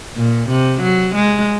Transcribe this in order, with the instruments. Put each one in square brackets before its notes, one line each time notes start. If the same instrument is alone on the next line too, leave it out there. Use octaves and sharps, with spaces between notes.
[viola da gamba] A#2
C3
F#3
G#3